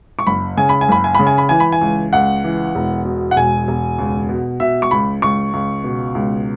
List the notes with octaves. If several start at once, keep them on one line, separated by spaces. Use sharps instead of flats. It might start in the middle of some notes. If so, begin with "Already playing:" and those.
C#6
F#1 B5
C#3 G#5
B5
G#5
F#1 B5
G#5
C#3 B5
G#5
B5
E3 G#5
B5
G#5
C#2
C#2 F#5
E3
E1
B2
F#5
E1 G#5
E1
C#2
B2
B2 E5
C#6
C#2 B5
C#2 C#6
C#2
B2
C#2